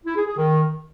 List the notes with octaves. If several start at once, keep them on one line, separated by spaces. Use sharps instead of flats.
E4
G#4
G#4
D#3